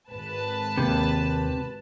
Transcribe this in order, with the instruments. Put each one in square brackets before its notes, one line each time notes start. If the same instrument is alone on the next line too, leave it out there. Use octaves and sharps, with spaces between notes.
[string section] G#1 B4 A5
[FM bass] D#2 [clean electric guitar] C3